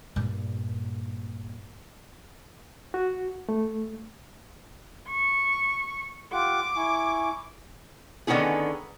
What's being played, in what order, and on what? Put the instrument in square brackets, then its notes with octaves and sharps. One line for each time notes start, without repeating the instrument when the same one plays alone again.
[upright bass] G2 A#2
[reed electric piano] F#4
A3
[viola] C#6
[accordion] F4 G4 F#5 [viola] D6
[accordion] E4 G#5 C#6
[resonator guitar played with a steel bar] D3 D#3 B3 C#4 E4 G#4